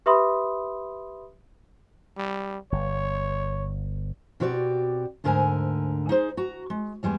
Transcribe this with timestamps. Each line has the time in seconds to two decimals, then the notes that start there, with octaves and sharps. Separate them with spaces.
0.06 G4 B4 E5 B5 C6 D#6
2.17 G3
2.72 G1 C#5
4.40 B2 C4 F#4 G4 C#5 D5
5.24 D2 G#2 D3 A#4 C5 G#5
6.09 D#4 G#4 C5
6.37 F#4 A#5
6.70 G#3
7.03 E2 G3 G#3 B3